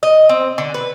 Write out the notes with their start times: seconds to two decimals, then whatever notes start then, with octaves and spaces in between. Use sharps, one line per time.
0.03 D#5
0.29 C4
0.58 D3
0.74 B4